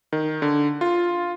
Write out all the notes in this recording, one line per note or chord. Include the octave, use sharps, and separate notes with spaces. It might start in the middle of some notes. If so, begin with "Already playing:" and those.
D#3
D3
F4